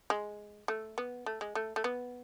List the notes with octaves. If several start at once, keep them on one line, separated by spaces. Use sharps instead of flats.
G#3
A3
B3
A3
G#3
A3
A3
B3